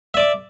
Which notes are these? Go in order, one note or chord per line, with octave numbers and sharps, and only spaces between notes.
D5 E5 D6